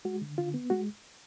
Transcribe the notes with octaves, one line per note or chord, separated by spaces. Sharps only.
G#3 F#4
D3
D3 F4
B3
G#3 F#4